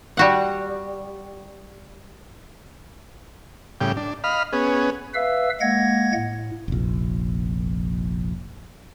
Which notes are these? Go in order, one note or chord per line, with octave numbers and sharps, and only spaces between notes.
G3 F#4 F#5
A2 C#3 G3 G5
D4
D#5 F5 B5 F6
B3 C#4 G#4
B4 E5 F5 E6
G#3 A#3 F#5 G#6 A#6
A2
F1 A#1